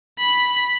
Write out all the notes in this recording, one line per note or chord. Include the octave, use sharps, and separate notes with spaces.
B5